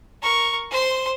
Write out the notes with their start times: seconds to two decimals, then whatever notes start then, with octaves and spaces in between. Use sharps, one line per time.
0.22 A#4 C#6
0.71 C5 C6